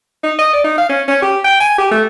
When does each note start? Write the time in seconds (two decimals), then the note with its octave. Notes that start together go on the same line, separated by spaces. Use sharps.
0.23 D#4
0.38 D#5
0.53 D5
0.64 D#4
0.78 F5
0.89 C#4
1.08 C#4
1.22 G4
1.44 G5
1.60 G#5
1.78 G4
1.91 A3